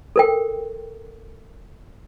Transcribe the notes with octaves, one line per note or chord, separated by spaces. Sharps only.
A4 A#4 G5